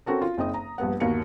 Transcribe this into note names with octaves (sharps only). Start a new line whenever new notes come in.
C4 C#4 F#4 A4 A#4
F4
F#1 C4 D#4 D#6
A#5
A#1 G2 B3 F#5
G1 D#2 F#4 A#4 C#7